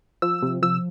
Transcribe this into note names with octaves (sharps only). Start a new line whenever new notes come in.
F3 E6
C3
F3 E6